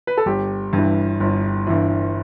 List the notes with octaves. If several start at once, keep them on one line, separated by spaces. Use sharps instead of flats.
B4
A4
G1 G4
G2
E3
G1
G2 E3